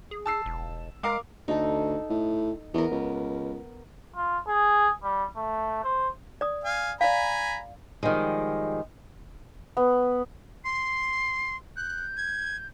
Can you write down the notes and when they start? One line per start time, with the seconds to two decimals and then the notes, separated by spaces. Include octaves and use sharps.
0.11 G#4
0.26 A5 E6 C7
0.46 E1
1.03 G#3 A#4 F5 D6
1.48 D2 D#4 A4
2.10 A2
2.74 E2 B3 A#4
2.91 C#2
4.16 F4
4.48 G#4
5.03 G3
5.36 A3
5.84 C5
6.41 D5 D#6
6.64 F5 G#5
7.01 D5 F5 G#5 A#5 B5
8.03 D#3 F3 G3 G#3
9.77 B3
10.65 C6 C7
11.76 F#6 G6
12.17 G#6